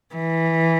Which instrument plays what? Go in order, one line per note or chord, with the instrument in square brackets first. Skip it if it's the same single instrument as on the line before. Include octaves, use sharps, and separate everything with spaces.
[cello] E3